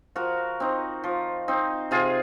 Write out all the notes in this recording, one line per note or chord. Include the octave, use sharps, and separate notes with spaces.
F3 F#4 A#4
C4 D#4
F3
C4 D#4
C3 F4 G#4